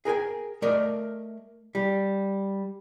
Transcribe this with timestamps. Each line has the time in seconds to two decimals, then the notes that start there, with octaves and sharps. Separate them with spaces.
0.05 G#4 A#4 G5 G#5
0.62 A3 A#4 D5 D#5
1.75 G3